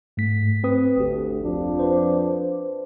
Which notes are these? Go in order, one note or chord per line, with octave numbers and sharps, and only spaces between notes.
G#2 A3 B6
C4 B4 D#6
G1 D2 G4
F2 F3 D4
B4 C5